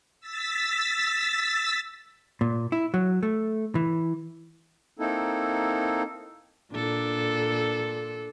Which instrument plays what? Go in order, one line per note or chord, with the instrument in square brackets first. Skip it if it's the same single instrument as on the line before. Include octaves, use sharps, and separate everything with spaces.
[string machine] E6 A6 B6
[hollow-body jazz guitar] A#2
E4
F#3
A3
E3
[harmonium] A#3 C4 D#4 E4 A4
[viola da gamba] A#2 D4 A4